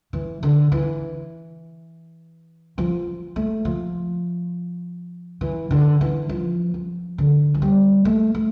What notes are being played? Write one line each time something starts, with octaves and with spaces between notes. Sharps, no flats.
E3
D3
E3
F3
A3
F3
E3
D3
E3
F3
F3
D3
F3
G3
A3
A3